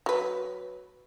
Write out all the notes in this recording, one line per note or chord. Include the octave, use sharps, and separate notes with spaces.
F#3 B4